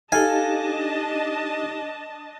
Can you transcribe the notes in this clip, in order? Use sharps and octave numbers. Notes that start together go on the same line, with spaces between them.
D4 D#4 G4 A4 D#5 F5 G#5 A5